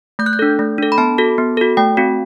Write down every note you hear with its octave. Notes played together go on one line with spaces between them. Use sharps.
A3 G6
F#6
G6
D4 A4
A3
D4 A4
B5
B3 A5
F#4 A4
B3
F#4 A4
A3 G5
C4 F#4